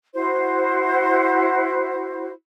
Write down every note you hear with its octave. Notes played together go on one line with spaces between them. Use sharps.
E4 F#4 C5